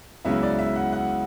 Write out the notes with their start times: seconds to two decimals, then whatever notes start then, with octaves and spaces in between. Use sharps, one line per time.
0.25 C#2 C#3 F#3 B3 E4 E5
0.43 D5
0.59 E5
0.76 F#5
0.93 F#5